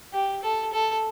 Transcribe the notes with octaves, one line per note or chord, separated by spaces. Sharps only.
G4
A4
A4